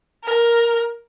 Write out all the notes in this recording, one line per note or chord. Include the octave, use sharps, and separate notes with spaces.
A#4